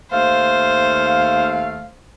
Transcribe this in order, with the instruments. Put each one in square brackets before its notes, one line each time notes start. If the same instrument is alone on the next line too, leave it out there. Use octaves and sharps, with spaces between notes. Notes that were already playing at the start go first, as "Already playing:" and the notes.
[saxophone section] D#2 A3 F5 [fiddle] C5